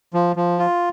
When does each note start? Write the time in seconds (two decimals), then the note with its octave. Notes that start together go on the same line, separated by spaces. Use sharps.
0.14 F3
0.36 F3
0.59 F4